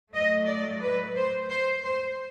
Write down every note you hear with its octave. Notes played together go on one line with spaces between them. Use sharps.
A2 F#3 A3 D#5
D5
B4
C5
C5
C5